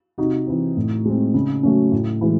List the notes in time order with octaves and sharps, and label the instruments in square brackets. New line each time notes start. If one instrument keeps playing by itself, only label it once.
[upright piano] C3 D#4 F#4
E3 C4
A2
G#3 C4
C#3
F#3 A3 C#4
A2
E3 G#3